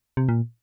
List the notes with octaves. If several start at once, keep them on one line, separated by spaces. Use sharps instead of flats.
C3
A#2